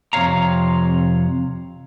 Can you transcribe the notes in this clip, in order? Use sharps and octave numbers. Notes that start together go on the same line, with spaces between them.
F2 C3 C#5 F5 A#5